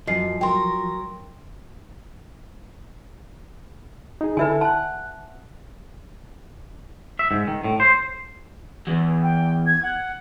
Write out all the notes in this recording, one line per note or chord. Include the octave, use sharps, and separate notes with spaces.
F#2 F3 D#5 C7
F#3 A#4 G5 C6
D#4 G#4
D3 E4 A4 B4 E5 G#5
F#5 A5 F#6
E5
G#2
D#3
A2
C5
E2
G5
G#6
F#5